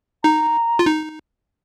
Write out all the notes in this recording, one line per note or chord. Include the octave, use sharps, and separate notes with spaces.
D#4 A#5
F4
D#4